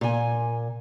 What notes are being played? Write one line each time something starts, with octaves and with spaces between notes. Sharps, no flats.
A#2 G#5